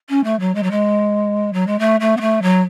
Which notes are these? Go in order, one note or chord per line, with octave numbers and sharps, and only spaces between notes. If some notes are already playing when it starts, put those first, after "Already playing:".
C#4
A3
F#3
G#3
F#3
G#3
F#3
G#3
A3
A3
B3
A3
F#3